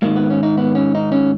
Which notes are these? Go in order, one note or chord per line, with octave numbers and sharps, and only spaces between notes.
G#2 D#3 A#3
B3
C#4
D#4
B3
C#4
D#4
C#4